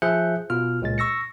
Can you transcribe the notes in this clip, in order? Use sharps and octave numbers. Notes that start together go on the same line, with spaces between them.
F3 G#4 E5 F#6 G6 C#7
B2 F4 F6
C#2 A#2 G#3 A6
C#6 E6 A#6 C#7